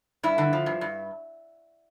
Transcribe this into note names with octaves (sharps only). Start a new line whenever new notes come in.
G2 E4
D3
F3
G2
G2